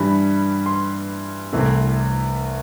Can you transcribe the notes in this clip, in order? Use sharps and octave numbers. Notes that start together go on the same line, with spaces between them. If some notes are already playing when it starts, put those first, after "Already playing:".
Already playing: G2 E3 G3 B5
C6
C2 C3 E3 A3 C4